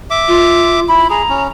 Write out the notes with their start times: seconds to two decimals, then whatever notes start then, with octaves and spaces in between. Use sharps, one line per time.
0.10 E5 D6
0.27 F4
0.89 E4 B5
1.10 G#4 A#5
1.29 C#4